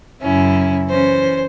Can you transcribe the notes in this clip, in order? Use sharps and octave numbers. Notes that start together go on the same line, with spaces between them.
F#2 C#3 C#4 E4
E3 C#4 C5